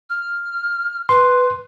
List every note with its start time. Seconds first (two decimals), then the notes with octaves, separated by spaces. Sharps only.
0.10 F6
1.09 B4 C6